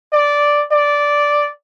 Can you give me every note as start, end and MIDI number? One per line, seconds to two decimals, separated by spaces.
0.13 0.63 74
0.72 1.49 74